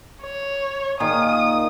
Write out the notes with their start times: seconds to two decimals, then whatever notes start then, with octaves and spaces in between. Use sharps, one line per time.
0.23 C#5
1.00 A#2 D#3 G#4 D#6